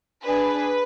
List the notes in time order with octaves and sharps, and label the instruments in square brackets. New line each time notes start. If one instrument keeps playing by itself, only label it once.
[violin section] D4 G#4 B4